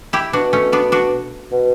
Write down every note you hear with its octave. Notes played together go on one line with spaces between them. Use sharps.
E4 G4
B2 D4 F#4
A3 C#4
B3 D4
D4 F#4
B2